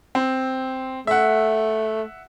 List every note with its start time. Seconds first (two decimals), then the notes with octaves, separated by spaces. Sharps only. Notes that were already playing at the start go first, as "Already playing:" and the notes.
0.15 C4
1.07 A3 E5 F#5